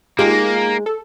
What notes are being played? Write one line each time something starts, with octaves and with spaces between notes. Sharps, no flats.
G#3 A#3 D#4 F4 G4
A4